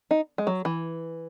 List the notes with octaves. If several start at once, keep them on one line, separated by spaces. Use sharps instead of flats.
D#4
G#3
F#3
E3